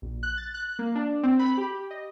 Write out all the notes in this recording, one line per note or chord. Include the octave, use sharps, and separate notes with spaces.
A#1
F#6
A6
F#6
A#3
D4
C4
B5
G4
D#5